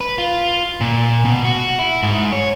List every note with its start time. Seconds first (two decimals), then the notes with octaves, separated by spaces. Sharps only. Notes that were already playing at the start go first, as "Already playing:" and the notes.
0.01 B4
0.18 F4
0.81 A#2
1.25 B2
1.44 F#4
1.79 E4
2.03 G#2
2.32 C#5